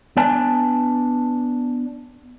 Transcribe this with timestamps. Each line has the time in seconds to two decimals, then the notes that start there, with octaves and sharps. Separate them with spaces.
0.17 B3 D4 D5 G#5 A5